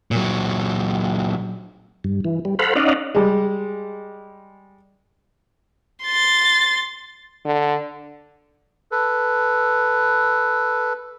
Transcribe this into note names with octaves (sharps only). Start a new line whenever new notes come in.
A#2 F#3
G2
E3
G3
A4 C5 F5 F#5 B5
C#4 D#4 D5 D#5 F5 F#5
G3 G#3
C6 A6
D3
A4 B4